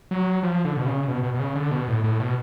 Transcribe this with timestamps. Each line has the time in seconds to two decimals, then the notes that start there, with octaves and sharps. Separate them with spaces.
0.11 F#3
0.43 F3
0.65 D3
0.77 B2
0.86 C#3
1.08 B2
1.23 B2
1.34 B2
1.39 C#3
1.55 D3
1.71 B2
1.88 A2
2.04 A2
2.20 B2